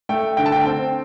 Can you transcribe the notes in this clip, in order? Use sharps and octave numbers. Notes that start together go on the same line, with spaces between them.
A3 G5
D3 G5
A5
G5
C4 G5